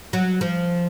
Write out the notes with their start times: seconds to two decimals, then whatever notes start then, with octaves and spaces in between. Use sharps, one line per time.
0.13 F#3
0.41 F3